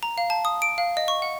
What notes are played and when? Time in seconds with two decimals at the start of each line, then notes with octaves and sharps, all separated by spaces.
0.03 A#5
0.18 F5
0.30 A5
0.45 D#6
0.62 D7
0.78 F5
0.97 D#5
1.08 C#6
1.22 F#5